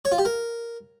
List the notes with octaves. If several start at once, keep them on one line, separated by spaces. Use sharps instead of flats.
C#5
F4
G4
A#4